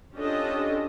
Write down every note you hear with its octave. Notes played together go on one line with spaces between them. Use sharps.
C#4 D4 F4 G4 A4 D#5